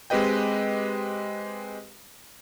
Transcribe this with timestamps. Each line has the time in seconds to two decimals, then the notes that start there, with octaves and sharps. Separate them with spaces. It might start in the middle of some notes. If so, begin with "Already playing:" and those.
0.10 G#3 C4 G4 B4 D#5 G5